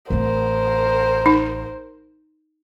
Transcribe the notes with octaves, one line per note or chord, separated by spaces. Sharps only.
A1 C4 A#4 C5
D#4